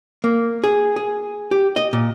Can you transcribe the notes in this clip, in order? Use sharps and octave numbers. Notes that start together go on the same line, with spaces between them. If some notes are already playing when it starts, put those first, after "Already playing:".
A#3
G#4
G#4
G4
D#5
A#2